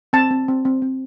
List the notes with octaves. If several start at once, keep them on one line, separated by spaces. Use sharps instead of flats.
C4 A5
C4
C4
C4
C4